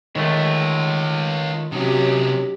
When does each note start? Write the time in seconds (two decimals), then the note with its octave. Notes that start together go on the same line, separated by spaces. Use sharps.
0.16 D#3 G#3 A3 F4 C#5
1.72 C3 F#3 C#4 D#4 G4